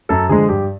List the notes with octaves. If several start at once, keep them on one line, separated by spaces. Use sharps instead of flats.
F#2 A4
D3 F3 G#3 G#4
G2 G4